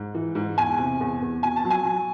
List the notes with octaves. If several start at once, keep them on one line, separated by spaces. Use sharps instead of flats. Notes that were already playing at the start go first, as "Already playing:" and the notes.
Already playing: G#2
E3
G#2
E2 G#5
C3
E2
E2
B2 G#5
A5
F#3
G#5
F#3